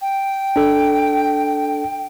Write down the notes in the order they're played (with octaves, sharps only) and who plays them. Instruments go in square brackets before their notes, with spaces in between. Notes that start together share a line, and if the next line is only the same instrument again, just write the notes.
[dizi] G5
[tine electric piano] D4 A4